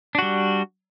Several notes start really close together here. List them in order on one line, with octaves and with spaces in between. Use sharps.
D4 F#4 G3